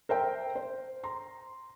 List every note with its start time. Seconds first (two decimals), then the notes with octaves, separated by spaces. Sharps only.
0.09 A#4 C5 E5 G5
0.55 C5
1.03 A#5 C6